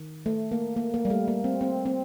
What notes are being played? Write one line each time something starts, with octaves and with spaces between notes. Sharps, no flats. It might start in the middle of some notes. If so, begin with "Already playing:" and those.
Already playing: D#3
A3
A#3
A#3
A#3
G3
A3
A#3
C4
C4
C4